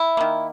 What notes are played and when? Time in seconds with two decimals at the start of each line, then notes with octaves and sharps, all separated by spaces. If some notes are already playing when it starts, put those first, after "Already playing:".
Already playing: E4
0.17 D#3 A#3